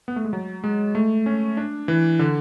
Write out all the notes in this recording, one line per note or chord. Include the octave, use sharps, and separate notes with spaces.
B3
A3
G#3
F#3
G#3
A3
C#4
D4
E3
D3